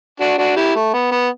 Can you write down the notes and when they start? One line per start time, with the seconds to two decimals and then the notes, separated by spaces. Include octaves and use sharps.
0.20 D4 F#4
0.38 D4 F#4
0.56 E4 G4
0.75 A3
0.94 B3
1.12 B3